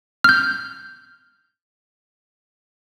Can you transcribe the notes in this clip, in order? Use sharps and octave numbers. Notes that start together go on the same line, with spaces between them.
F6 G6